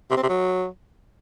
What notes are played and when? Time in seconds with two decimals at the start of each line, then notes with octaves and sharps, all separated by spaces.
0.11 C3
0.17 C4
0.23 C3
0.29 F#3